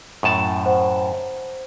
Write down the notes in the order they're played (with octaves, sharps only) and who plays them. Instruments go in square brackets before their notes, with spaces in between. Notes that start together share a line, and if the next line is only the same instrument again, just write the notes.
[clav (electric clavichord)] F#2 A2 A5
[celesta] C5 F#5